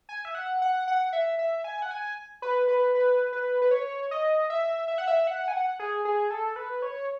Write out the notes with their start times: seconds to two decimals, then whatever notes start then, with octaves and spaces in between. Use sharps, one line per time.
0.09 G#5
0.25 E5
0.35 F#5
0.62 F#5
0.88 F#5
1.13 E5
1.39 E5
1.64 G#5
1.82 F#5
1.91 G#5
2.42 B4
2.68 B4
2.95 B4
3.33 B4
3.62 B4
3.71 C#5
4.11 D#5
4.50 E5
4.88 E5
4.98 F#5
5.08 E5
5.27 F#5
5.48 G#5
5.53 F#5
5.80 G#4
6.05 G#4
6.31 A4
6.56 B4
6.82 C#5